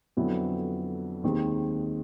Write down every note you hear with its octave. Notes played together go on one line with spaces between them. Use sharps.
F2 D3 F#3 B3 E4
D#2 D#3 G#3 C4